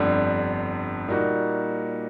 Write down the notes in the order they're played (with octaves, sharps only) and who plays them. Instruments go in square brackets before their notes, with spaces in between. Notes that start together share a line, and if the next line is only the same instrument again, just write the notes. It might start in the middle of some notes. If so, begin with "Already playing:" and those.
Already playing: [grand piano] G1 F2 D3 G3
A#2 G3 A#3 D#4 F#4